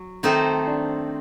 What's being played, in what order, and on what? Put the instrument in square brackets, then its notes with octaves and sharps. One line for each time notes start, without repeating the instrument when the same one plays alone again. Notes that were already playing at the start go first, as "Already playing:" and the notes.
Already playing: [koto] F#3
[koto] D#3 A3 D#4 A4 C5 [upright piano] C4
[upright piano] D4